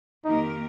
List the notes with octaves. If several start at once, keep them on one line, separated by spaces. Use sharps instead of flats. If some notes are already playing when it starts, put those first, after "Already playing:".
F2 D#3 A#3 D#4 G4 A#4